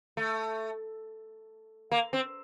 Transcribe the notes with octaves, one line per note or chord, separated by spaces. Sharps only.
A3
A#3
C4